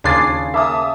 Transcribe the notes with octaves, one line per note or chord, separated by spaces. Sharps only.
D#2 C#3 D4 F4 G#4 G#6 A6 C7
A#3 E5 A5 D#6